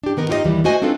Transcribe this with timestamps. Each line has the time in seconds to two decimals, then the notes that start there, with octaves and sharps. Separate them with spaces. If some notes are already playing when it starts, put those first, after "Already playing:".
0.04 D4 G4
0.17 D#3 B3 A#4
0.29 D#4 F4 G4 C#5 D#5
0.44 D#2 E3 G3
0.64 G#3 A3 F#4 C5 D#5 G#5
0.82 C4 D4 D#4 F4 A4 B4